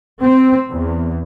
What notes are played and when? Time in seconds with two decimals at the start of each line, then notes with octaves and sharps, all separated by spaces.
0.22 C4
0.69 E2